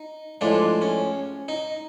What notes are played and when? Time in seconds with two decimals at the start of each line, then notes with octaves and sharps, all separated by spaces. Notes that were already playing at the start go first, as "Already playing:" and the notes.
Already playing: D#4
0.41 A2 F3 G#3 D4
0.82 C#4
1.48 D#4